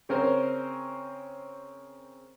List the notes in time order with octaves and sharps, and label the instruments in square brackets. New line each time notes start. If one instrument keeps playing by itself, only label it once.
[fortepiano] C#3 C4 C#4 A#4 C5